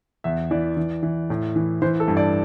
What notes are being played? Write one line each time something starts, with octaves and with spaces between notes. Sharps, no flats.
E2 E5
E3 D5
E3
E3
A2
E3
E3 C5
A4
G2
D5